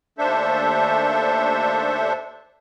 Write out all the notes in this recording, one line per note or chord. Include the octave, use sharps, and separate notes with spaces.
D#2 A3 D4 A4 C5 E5